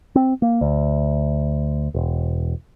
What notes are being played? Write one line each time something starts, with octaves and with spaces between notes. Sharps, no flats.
C4
A#3
D2
E1